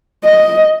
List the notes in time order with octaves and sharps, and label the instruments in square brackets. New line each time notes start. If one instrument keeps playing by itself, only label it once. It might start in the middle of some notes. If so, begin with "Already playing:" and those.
[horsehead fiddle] D#5